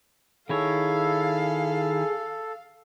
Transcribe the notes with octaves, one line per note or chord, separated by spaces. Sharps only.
D#3 E4 G#4 A4 C#5 F5